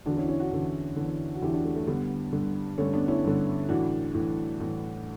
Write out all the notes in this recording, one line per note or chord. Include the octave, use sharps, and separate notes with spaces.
E2 D3 D4 F#4
C#4 E4
C#4 E4
D4 F#4
E2 D3
E2 D3
F#4
E2 D3 E4 G4
D4 F#4
A3
A3
G2 D3 G3 B3
G2 D3
G2 D3 A3 C#4
B3 D4
C#4 E4
G2 D3
A2 E3 D4 F#4
A2 E3
A2 E3